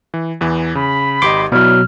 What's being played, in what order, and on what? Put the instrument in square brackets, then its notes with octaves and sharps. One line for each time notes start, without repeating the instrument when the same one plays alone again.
[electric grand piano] E3
E2 E3
[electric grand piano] C#3 [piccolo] B5
[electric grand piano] G#1 G4 D#5 [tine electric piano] C6 D6
[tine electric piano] B2 F#3 [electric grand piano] E4 C#5 D5 [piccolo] F6